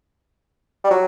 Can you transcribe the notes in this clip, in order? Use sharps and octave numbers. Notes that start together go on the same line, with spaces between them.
G3
F#3